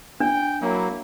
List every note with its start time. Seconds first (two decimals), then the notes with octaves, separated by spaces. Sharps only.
0.20 D4 G5
0.62 F#3 A#3 E4